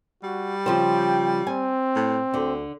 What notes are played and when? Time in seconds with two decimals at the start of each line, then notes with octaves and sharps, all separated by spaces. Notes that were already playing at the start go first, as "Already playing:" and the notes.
0.23 G3 F#4
0.66 C#3 F3 C5 G5
1.47 C4 G#5
1.96 A2
2.34 D2 D3